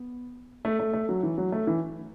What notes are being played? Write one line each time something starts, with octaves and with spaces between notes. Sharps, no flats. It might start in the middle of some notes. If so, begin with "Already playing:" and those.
Already playing: B3
A3
A3
A3
F#3
E3
F#3
A3
E3